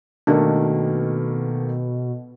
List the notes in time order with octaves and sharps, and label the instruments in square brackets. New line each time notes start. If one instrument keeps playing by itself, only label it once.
[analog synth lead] B2 [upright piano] D#3 A3 A#3 [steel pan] D4